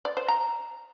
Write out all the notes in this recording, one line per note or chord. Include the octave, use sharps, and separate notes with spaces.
D5
C5
A#5